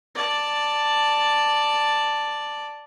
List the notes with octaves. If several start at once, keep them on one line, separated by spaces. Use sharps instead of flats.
D5 A5